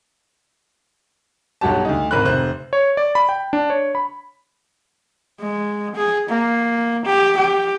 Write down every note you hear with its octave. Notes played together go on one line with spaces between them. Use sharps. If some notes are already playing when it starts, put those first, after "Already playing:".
B1 G2 F#3 F#4 G4 A5
D2 D#4
D1 G#1 A#4 B5 F#6
F1 C5 F#6
C#5
D5
B5
G5
D4
C#5
B5
G#3
G#4
A#3
G4
G4